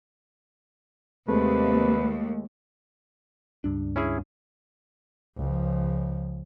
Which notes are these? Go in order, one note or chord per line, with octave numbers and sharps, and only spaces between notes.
D#2 C3 G#3 A3 B4
C#2 G2 D4
C#4 E4 G#4
C#2 F3